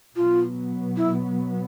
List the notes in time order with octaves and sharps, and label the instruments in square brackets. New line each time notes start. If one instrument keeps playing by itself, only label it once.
[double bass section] B2 F#3 B3 [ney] F4
[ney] E4